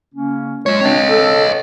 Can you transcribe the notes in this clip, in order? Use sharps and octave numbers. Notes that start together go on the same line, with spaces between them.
C#3 A#3 C#4
F#2 G#3 F4 C#5
C4 D4 C#5 D#5
A4